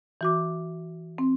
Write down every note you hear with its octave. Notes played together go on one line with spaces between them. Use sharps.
E3 F#4 D6
C4